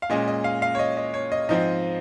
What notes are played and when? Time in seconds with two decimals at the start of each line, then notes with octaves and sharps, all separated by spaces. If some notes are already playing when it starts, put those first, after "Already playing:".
0.02 F5
0.10 A#2 G#3 C#4 D#5
0.28 D#5
0.44 F5
0.62 F5
0.75 C#5
0.79 D#5
0.97 D#5
1.14 C#5
1.32 D#5
1.49 G#2 F3 C4 D#5